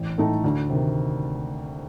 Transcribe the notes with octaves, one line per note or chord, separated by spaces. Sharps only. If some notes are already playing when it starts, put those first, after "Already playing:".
Already playing: A1
A2 A3 D#4 A4
D2
C3 D#3